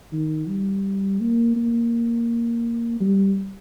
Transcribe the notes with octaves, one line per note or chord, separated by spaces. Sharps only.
D#3
G3
A#3
A#3
G3